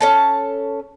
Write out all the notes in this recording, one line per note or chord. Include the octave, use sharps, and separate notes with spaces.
C#4 A4 A5